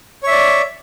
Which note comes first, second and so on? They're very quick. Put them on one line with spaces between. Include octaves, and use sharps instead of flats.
C#5 E5 D5